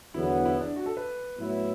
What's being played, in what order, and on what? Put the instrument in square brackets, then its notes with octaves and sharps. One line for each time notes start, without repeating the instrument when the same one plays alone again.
[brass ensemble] E2 D3 F#3 B3 [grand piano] E4
[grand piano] E4
D4
F#4
A4
B4
[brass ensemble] A2 F#3 B3 E4